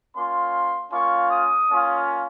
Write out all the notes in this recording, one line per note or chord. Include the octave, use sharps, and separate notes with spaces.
A#3 C#4 F4 C6
A#3 C#4 F4 C#6
D#6
A#3 C#4 F4